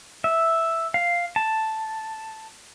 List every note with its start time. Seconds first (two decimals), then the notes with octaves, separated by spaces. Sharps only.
0.24 E5
0.94 F5
1.36 A5